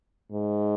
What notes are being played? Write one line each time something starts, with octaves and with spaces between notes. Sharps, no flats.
G#2